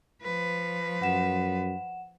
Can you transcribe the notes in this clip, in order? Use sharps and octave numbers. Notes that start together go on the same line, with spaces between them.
F3 B4
F#2 F#5 E7